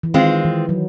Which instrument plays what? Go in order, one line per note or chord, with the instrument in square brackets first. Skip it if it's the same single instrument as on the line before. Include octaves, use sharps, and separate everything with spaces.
[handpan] E3
[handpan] D#3 [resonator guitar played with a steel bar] G#3 C4 F4
[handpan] E3
F#3